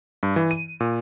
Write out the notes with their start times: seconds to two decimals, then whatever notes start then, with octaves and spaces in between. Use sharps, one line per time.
0.23 G2
0.36 E3
0.51 D#7
0.80 A#2